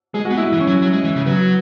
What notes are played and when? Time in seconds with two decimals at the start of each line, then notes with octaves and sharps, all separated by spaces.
0.14 G#3 G#4
0.25 F#4
0.30 B3
0.37 G#3 E4
0.53 E3
0.60 C#4
0.67 F#3
0.82 F#3
0.93 G#3
1.04 E3
1.16 C#3
1.26 F#3 B3